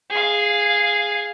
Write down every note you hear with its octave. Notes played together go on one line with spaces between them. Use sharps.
G#4 F5